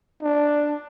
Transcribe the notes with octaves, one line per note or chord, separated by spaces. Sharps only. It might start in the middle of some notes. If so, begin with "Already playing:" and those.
D4